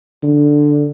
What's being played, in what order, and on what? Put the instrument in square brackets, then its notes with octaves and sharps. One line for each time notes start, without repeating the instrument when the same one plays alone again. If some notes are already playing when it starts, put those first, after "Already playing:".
[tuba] D3